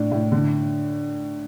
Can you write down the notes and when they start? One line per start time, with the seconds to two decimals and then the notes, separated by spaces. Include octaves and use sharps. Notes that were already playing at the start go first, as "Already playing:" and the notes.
Already playing: A2 D4
0.12 A2
0.32 D3